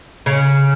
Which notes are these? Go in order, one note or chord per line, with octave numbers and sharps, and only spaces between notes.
C#3